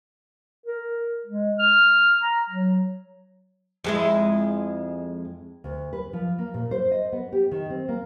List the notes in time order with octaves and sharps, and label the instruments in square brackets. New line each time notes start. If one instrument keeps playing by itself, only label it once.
[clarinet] A#4
G#3
F6
A#5
F#3
[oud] F2 G#3 E4
[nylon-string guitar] D2
B4
F3
A#3
A#2
C5
D#5
B3
G4
D#3
C4
A#3